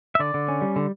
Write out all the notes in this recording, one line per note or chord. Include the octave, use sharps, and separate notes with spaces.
E5
D3 D5
D3
C#4
G3
D3